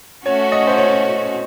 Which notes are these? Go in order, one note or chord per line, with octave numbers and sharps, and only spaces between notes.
A3 C#4 F#4 C#5
D#5
C5
C#5